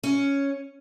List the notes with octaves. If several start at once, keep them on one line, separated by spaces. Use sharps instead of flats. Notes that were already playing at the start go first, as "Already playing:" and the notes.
C#4